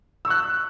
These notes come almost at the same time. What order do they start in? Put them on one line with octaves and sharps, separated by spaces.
E6 C#6 F#6